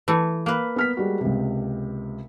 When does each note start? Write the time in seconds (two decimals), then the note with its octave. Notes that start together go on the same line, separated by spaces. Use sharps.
0.08 E3 A3
0.46 A#3 B4
0.76 B3 F6 B6
0.97 G3 G#3 F#4
1.21 C#2 C3